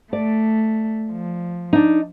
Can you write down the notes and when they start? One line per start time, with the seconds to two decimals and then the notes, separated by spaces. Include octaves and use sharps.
0.13 A3 D5
1.12 F3
1.73 D4 D#4